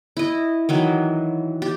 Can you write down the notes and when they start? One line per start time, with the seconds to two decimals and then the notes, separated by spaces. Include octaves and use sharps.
0.17 E4 D#5
0.69 D#3 E3 F#3
1.62 G4